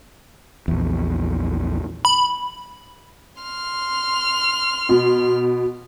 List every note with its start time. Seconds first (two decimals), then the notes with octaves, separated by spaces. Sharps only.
0.68 A#1 E2
2.05 B5
3.42 C6 F6
4.89 B2